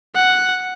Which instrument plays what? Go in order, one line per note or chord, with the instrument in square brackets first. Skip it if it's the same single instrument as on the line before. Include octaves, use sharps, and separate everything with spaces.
[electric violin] F#5